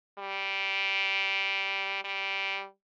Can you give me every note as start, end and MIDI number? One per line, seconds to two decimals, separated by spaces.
0.18 2.04 55
2.04 2.66 55